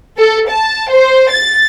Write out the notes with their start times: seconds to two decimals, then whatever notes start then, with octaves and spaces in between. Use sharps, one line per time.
0.18 A4
0.49 A5
0.91 C5
1.31 A6